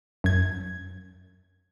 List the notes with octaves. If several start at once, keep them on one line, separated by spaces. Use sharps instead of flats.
F#2 G#6